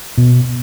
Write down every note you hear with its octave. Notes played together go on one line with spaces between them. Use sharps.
B2